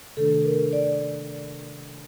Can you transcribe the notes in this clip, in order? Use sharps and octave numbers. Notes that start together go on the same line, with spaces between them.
C3 D#3 A3 D4 A4
A#4
D5